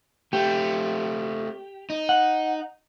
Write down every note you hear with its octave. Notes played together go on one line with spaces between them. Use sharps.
A3 C4 G4
D#4
F#5